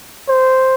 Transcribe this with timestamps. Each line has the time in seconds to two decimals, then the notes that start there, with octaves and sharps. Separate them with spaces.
0.28 C5